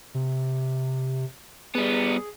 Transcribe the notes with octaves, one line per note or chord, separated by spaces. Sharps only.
C3
G3 B3 G#4